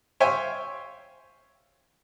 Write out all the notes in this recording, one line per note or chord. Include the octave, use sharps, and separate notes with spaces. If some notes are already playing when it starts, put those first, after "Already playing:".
C5 C#5 E5 F5 G5 G#5